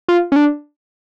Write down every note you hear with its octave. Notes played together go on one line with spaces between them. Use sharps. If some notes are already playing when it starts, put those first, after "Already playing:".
F4
C#4
D4